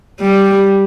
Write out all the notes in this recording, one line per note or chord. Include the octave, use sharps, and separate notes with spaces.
G3